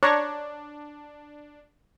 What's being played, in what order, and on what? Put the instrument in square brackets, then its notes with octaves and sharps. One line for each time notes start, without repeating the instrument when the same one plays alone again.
[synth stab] D4 [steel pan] C#5 A#5 C#6